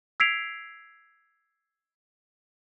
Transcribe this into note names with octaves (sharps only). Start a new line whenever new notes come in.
E6 G#6 B6 C7 D7 F7